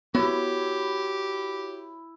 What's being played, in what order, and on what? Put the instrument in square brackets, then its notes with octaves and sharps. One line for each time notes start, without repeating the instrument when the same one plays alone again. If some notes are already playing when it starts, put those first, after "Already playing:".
[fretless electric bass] B3 [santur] E4 [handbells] F#4 C#5 [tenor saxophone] G4